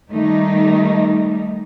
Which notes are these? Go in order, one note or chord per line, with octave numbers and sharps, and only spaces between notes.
D#3 G3 A3 D#4